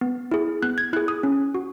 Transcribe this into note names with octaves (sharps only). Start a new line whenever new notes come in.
B3
E4 G#4
B3 F#6
G#6
E4 G#4 F#6
D#6
C#4
F#4